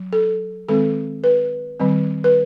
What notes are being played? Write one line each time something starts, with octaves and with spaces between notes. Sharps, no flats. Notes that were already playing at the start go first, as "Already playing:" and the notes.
Already playing: F#3
A4
D#3 G#3 C4 A4
B4
D#3 G3 C4
B4